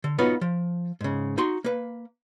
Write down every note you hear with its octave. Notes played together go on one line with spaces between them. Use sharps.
D3
B3 D#4 F4 F#4 B4 C#5
F3
G#2 C#3
D#4 F#4 C6
A#3 B4